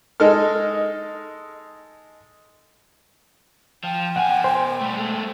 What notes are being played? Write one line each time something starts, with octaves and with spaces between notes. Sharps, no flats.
G#3 D#4 A4 F6
F3 G5
B2 F#5 G#5
C5
G3 A3
G#3 A3